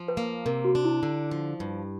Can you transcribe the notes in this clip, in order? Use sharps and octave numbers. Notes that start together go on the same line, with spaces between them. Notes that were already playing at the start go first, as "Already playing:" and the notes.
Already playing: F3
B4
A#3
C3 A#4
F#4
D4
E4
D3
F3
G2